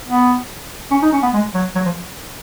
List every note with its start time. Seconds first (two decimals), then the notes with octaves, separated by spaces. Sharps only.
0.07 B3
0.91 C#4
1.02 D#4
1.12 C#4
1.23 B3
1.34 G#3
1.54 F#3
1.75 F#3
1.86 F3